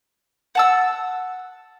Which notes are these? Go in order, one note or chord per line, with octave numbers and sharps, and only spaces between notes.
F#5 A5 E6